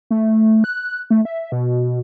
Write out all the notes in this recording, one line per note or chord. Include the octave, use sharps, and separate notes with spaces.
A3
F#6
A3
E5
B2